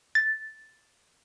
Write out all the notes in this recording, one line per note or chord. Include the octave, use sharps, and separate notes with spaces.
A6